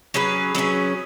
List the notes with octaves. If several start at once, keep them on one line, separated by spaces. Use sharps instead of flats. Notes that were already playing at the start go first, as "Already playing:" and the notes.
F#3 C#4 G#4 B4
F#3 C#4 G#4 B4